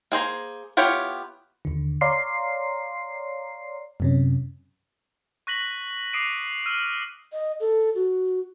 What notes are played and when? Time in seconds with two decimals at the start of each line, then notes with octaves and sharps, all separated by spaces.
0.12 A#3 G#4 C5 A#5
0.77 B3 E4 F4 G4 C#5
1.65 D#2 D3
2.01 C#5 D5 F5 A#5 C6 C7
4.00 F#2 C3 C#4
5.47 C#6 F#6 A#6 B6 F#7
6.13 D6 D#6 C7 D7 D#7
6.66 E6 F6 D#7
7.33 D#5
7.60 A4
7.95 F#4